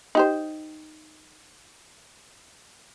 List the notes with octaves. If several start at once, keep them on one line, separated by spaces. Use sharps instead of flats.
D#4 G4 C5